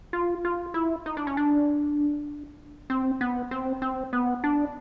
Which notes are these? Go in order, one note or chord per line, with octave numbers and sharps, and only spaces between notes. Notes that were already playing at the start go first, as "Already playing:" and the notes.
F4
F4
E4
D#4
D4
C#4
D4
C4
B3
C4
C4
B3
D4